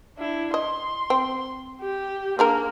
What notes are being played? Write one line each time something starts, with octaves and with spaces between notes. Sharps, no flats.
D4 E4
D#5 C6
C4
G4
A#3 D4 G#4 A#4